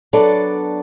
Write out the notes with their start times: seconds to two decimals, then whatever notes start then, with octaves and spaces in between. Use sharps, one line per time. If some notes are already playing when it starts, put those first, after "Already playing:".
0.13 F#3 B3 D4 A4 D5